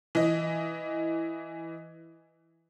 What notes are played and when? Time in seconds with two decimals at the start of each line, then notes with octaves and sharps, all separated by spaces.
0.15 E3 D#5